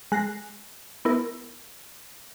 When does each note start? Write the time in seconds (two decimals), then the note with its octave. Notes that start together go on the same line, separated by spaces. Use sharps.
0.12 G#3 F#6 A#6 C7
1.05 B3 E4 A#4